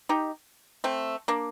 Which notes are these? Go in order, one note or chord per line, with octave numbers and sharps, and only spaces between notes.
D#4 G4
A3 C4
A#3 D4